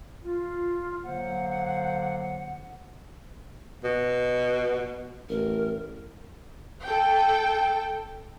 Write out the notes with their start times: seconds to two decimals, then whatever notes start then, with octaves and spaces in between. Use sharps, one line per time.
0.23 F4
1.04 D3 F#3 A#3 C5 F#5
3.84 B2
5.29 A1 A#4
6.84 A4 G5